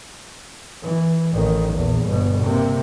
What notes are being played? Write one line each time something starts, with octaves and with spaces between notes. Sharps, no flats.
E3
A1 D#3
A#1 E2
G1 B2
C3 A#3